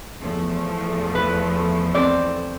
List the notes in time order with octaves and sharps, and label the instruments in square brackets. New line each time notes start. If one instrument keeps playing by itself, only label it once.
[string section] E2 F3 A3
[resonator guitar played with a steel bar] B4
C4 D5